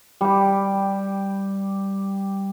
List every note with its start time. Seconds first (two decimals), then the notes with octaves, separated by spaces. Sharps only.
0.21 G3 G4